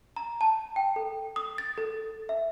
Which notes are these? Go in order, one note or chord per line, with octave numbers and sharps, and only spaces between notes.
A#5
A5
G5
A4
D#6
A6
A4
E5